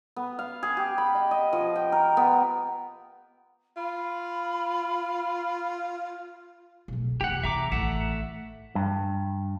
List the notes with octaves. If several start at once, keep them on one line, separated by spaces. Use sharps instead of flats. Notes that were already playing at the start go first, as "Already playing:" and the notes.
B3
F5
G#4
G4
B5
D#5
D#5
F3
G5
A#4
B3
F4 B5
B1 A2
F1 E2 G4 F#5
E2 C3 E5 A#5 D6
A1 D#3 A3 E5 F#5
G2